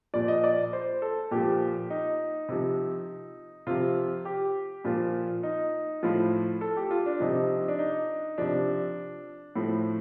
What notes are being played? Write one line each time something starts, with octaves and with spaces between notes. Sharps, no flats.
A#2 F3 D5
D#5
D5
C5
A4
A#2 F3 G4
D#4
C3 F3
C3 F3 F4
G4
A#2 F3 F4
D#4
A2 F3 F4
A4
G4
F4
D4
C3 F3 D#4
D4
D#4
C3 F3 D4
A2 F3